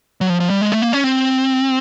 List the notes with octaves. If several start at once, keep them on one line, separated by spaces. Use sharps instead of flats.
F#3
F3
F3
G3
G#3
A3
A#3
C#4
C4